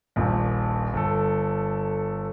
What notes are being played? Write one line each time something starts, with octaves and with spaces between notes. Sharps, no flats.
D#1 A#1
G1 A4